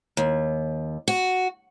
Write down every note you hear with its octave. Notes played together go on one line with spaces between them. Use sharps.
D#2
F#4